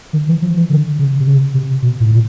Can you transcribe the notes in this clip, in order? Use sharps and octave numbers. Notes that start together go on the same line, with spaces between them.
D#3
E3
F3
E3
D3
C#3
C3
C#3
C3
B2
A2
A#2